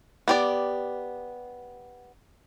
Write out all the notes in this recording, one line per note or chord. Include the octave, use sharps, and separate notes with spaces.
B3 G4 D5